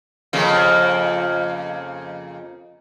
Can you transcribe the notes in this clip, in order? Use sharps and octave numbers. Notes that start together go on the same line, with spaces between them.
F2 C#3 A#3